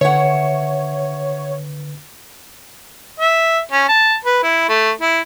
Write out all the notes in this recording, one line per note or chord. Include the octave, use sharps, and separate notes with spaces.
D3 B4 C#5 E5 F#5
E5
C#4
A5
B4
E4
A3
E4